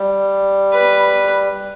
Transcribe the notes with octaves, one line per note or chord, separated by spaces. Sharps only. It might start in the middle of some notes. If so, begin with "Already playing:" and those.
Already playing: G3
B4